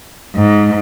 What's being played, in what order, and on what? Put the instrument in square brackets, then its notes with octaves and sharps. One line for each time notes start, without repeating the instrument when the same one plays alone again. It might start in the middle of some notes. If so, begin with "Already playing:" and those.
[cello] G#2